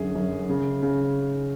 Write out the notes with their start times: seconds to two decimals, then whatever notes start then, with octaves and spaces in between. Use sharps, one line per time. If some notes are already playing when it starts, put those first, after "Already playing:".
Already playing: F#2 D3 G#4
0.15 F#2
0.49 C#3
0.82 C#3